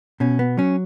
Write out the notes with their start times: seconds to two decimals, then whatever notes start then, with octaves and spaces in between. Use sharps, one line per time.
0.20 B2 C#4
0.39 B3
0.57 F#3 C#4